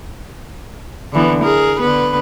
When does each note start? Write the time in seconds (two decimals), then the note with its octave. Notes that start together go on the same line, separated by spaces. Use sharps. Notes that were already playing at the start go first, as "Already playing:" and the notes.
1.13 D3 E3 B3
1.42 G#4 A#4
1.80 D3 B3 B4